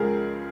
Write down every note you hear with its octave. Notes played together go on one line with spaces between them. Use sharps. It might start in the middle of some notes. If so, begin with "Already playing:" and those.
Already playing: C#2 C#3 F3 G#3 G#4 A#4